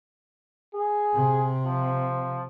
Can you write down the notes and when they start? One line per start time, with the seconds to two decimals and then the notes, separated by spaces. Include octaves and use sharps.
0.75 G#4
1.14 C3
1.66 F3